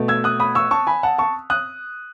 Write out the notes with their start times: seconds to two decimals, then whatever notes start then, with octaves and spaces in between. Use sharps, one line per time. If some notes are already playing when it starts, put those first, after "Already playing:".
Already playing: B2 A3
0.08 E6 G#6
0.24 D#6 F#6
0.40 B5 D#6
0.55 C#6 E6
0.71 A5 C#6
0.87 G#5 B5
1.03 F#5 A5
1.18 A5 C#6
1.50 D#6 F#6